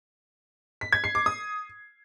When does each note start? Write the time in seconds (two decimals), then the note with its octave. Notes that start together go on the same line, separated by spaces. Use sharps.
0.81 B6
0.93 G#6
1.04 C7
1.15 D6
1.26 D#6